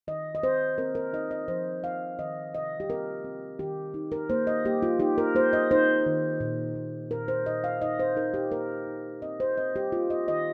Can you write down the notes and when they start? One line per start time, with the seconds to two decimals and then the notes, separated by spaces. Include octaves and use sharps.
0.08 D#3 D#5
0.35 D#5
0.43 C4 C5
0.78 C4 A#4
0.95 A#4
1.13 D#4 D#5
1.31 D#5
1.48 F3 C5
1.84 F3 F5
2.19 D#3 D#5
2.54 C3 D#5
2.80 G4
2.89 C4 A#4
3.24 C4
3.59 D#3 G4
3.94 D#4
4.12 A#4
4.30 A#3 C5
4.47 D#5
4.65 A#3 G4
4.83 F4
5.00 D#4 G4
5.18 A#4
5.35 A#3 C5
5.53 D#5
5.71 D#4 C5
6.06 D#3
6.40 A#2
6.76 A#2
7.11 A#2 A#4
7.28 C5
7.46 A#2 D#5
7.64 F5
7.82 D#4 D#5
7.99 C5
8.16 D#4 A#4
8.34 G4
8.51 A#3 A#4
8.87 D#4
9.22 C4 D#5
9.40 C5
9.58 C4 D#5
9.76 G4
9.92 A#3 F4
10.10 D#5
10.28 D#3 D#5